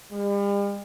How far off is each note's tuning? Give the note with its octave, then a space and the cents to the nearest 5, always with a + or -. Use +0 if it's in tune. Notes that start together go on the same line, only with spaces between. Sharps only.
G3 +45